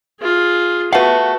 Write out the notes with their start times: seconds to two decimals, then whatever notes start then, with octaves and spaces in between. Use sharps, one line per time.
0.20 F4 G#4
0.93 A3 F#4 B4 F5 F#5